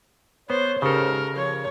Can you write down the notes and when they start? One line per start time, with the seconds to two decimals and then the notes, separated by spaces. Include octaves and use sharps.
0.50 B3 C5 C#5
0.82 G#2 C#3 G4 A4 A#4
1.36 F3 C#5